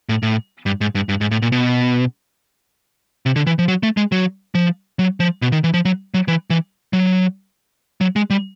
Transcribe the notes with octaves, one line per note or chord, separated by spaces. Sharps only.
A2
A2
G2
G#2
G2
G2
G#2
A2
A#2
B2
C3
D3
E3
F3
F#3
A3
G#3
F#3
F3
F#3
F3
B2
D#3
E3
F3
F#3
F#3
E3
E3
F#3
F#3
G#3
G3